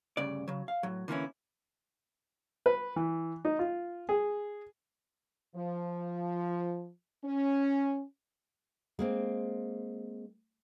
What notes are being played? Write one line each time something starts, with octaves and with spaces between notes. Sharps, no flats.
D2 G2 C#3 D5
C#3 F#3
F5
A2 F#3
D3 E3 A#3 C4 C#4 E4
B4
E3
D#4
F4
G#4
F3
C#4
G#3 A#3 C4